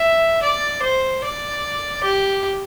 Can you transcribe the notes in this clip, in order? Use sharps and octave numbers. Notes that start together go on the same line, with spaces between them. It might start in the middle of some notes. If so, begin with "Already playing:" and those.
Already playing: E5
D5
C5
D5
G4